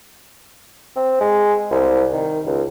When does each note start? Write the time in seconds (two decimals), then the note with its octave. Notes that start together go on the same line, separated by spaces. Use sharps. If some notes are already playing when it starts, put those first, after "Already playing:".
0.96 C4
1.21 G#3
1.70 C2
2.13 D#3
2.46 C#2